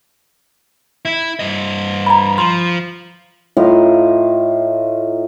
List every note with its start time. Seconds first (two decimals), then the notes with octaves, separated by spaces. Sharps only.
1.05 E4
1.39 G2 D#5
2.06 A#5 B5
2.38 F3 C6
3.57 A2 F4 D#5 A#5